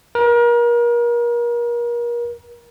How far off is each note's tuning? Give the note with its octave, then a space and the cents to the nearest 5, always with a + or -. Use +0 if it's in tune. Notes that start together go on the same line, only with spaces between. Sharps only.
A#4 +35